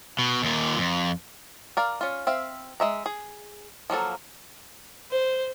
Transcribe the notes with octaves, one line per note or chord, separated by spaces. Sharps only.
B2
D#2 A#2
F2
A#4 D5 F5
C#4 F4
C4 E5 F5
G#3 E5 A#5
G#4
F3 F#3 A#3 A4
C5